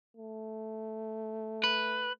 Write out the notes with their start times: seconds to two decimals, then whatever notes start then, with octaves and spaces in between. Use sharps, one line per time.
0.17 A3
1.64 B4